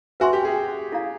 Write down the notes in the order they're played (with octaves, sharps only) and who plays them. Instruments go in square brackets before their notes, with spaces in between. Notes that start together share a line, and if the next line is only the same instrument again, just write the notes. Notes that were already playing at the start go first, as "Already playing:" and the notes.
[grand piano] F#4 [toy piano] B4 E5 G#5 C6
[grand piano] G4
G#4
[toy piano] E4 A4 D5 F5 A#5